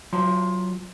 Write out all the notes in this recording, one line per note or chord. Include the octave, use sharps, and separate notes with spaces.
F#3 F4 C6